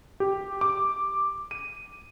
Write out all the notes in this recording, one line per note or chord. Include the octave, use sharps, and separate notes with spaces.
G4
D6
D#7